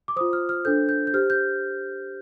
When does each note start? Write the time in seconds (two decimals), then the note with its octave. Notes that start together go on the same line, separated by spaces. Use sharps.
0.08 D6
0.16 F4 C5 D#6
0.33 F6
0.49 F6
0.65 D4 A4 C5 G6
0.89 G6
1.07 G6
1.14 G4 C5 F6
1.30 G6